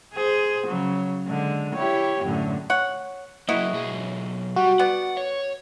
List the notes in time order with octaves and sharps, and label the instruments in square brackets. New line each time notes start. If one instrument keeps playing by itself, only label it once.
[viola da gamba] G#4 C5
C#3 F#3
D3 G#3
E4 G4 C#5
F#2 A2 D3
[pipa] C#5 F#5
[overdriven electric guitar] F#3 A#3 [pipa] E4 F#4 D#5
[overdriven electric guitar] B1 G#4
[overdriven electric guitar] G3 [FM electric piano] F#4
[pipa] B3 D5 [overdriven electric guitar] F#5
[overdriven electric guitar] C#5